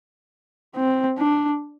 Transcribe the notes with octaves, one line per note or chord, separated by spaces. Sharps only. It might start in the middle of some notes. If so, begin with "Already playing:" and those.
C4
D4